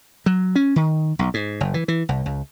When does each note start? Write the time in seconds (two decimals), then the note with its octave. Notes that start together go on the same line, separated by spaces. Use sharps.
0.26 F#3
0.56 C#4
0.76 D#3
1.19 B1
1.34 G#2
1.61 F#1
1.74 E3
1.88 E3
2.09 C2
2.26 C#2